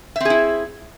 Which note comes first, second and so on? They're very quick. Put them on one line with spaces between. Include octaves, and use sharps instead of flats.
E5 C4 G#4 E4